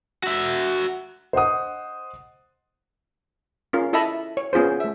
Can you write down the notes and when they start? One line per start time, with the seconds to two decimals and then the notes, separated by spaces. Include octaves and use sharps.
0.24 F#4 E5
1.33 C5 D#5 F#5 D#6
3.73 C#4 F4 A#4 F5
3.93 E4 A4 D#5 E5 A5 B5
4.37 C#5
4.53 B3 C#4 F4 G#4 C5
4.80 A3 E5